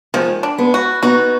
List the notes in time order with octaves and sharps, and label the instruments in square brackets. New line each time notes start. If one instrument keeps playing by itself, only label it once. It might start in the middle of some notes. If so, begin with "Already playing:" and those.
[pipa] D#3 [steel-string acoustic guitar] F3 G#3
[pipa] D4
[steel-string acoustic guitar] G#3 B3
[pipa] F#4
[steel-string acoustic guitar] B3 D#4 [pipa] F#4